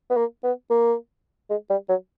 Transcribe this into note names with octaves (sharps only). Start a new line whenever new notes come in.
B3
A#3
B3
A#3
G#3
G3
F#3